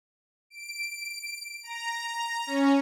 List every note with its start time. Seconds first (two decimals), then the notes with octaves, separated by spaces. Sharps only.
0.50 D7
1.63 A#5
2.47 C#4